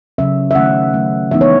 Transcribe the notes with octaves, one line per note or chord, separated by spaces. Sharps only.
C#3 F#3 C#4 E5
E5
D#3 A3 C#4 F#5
F#3 A3 C#4
E3 G#3 B3 D#4 E5
C#5